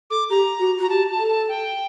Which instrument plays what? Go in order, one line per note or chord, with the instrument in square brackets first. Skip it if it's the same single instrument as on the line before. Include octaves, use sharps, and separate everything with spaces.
[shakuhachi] A4 [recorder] D6
[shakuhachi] G4 [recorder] A#5
[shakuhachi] F#4
[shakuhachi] F#4 [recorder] A#5
[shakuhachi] G4 [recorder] A5
[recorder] A5
[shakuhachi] A4
[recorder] A5
G5